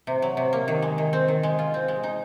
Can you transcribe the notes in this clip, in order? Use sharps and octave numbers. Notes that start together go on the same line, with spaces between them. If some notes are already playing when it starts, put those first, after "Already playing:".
C3
F#3
C3
A#3
D#3
G#3
D#3
C4
D#3
G#3
F4
C4
G#3
D#4